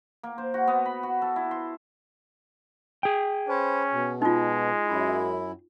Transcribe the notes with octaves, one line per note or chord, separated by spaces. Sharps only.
A#3
C5
F#4
B3
B5
F#4
A4
E4
C6
G#4 G5
C#4 B4 C5
B2
G#3 D#4 F4
F#2 E4